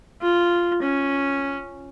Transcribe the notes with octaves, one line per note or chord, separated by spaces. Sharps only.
F4
C#4